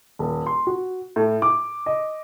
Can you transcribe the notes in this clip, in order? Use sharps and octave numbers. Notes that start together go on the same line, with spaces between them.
D#1
C6
F#4
A2
D6
D#5